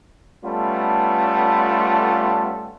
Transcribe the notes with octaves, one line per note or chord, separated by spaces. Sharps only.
G3 A3 B3 C#4 F4 A4